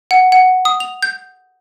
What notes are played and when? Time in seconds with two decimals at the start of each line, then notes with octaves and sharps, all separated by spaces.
0.11 F#5
0.32 F#5
0.65 D#6
0.80 F7
1.02 G6